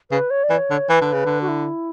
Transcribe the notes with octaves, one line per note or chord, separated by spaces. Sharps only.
C#3 B4
C#5
D5
E3
C#5
D3
E3 B4
D3
C#3
D3
F#4
E4